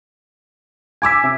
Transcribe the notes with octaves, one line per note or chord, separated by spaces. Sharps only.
G#5 D6 E6 G#6 B6
C3